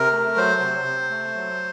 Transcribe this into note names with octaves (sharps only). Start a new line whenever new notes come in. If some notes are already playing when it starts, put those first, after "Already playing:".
Already playing: C3 A#4
A3
F#3 C5
C3
C3
A3
F#3